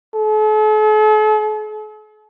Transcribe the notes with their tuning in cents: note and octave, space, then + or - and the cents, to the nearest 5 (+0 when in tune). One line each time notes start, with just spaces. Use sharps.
A4 -45